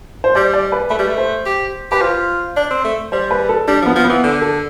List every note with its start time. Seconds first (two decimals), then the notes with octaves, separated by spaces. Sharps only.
0.24 C5
0.35 G3 D5
0.53 D5
0.72 B4
0.90 A3 B4
0.99 G3
1.08 A3
1.18 C5
1.46 G4
1.91 G4 B4
2.01 F4 C5
2.57 D4
2.71 C4
2.84 A3
3.12 G3 C5
3.31 B4
3.49 A4
3.68 G3 D4
3.82 F3 B3
3.96 F3
4.05 E3 B3
4.23 D3
4.41 A4